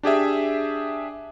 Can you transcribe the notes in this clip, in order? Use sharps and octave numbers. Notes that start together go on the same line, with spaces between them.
D4 G4 G#4 E5